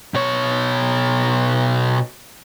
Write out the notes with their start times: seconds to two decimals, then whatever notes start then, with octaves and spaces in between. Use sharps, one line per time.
0.14 B2 C#5